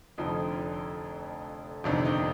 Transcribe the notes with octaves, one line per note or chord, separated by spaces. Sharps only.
F1 F2 D3 F3 D#4
G1 F2 C3 D#3 D4
D#4